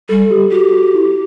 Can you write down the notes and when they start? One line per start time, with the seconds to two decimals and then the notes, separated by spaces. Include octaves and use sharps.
0.09 G3 A4
0.31 G4
0.52 F#4 G4
0.73 F#4
0.94 E4